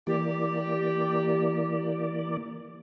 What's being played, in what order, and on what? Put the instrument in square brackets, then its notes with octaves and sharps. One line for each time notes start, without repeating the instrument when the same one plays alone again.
[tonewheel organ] E3 A#3 D5 [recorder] G4